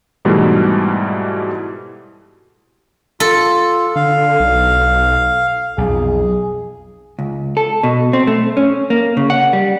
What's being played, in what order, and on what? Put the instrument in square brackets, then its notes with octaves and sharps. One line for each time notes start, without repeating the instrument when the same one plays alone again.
[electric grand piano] G#2 B2 E3 G3 A3
[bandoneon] F4 [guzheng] A4
[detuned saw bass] D3 [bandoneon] F5
[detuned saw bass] B1
[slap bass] B1 F2 [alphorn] G#4
[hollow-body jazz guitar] C#2
A4
B2
C4
A3
C#4
A#3
C#3
F#5
G3